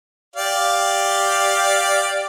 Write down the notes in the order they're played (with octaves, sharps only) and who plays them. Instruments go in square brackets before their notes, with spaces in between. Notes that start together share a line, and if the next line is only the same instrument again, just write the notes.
[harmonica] G4 D5 F5